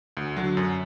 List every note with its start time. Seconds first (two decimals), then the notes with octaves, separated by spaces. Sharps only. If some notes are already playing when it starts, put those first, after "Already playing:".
0.17 D2
0.36 D3 F#3
0.57 F#2